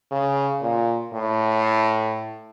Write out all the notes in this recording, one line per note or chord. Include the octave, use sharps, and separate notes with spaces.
C#3
A#2
A2